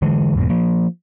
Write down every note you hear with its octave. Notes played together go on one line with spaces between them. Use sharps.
D3 E3 G#3
E2 G#2 B2
F3 A#3